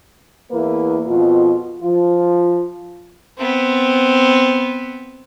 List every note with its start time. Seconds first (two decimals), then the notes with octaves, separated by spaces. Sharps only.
0.51 E2 A#3 E4 B4
1.07 F2 B2 F4
1.83 F3 F4
3.38 B3 C4